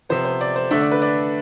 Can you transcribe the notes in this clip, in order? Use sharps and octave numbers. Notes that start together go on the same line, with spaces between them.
C3 F3 B3 C5
C5
D5
C5
D3 A3 D4 E5
D5
B4
D5